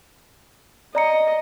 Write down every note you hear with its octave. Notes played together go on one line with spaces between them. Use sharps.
D5 D#5 A#5 C#7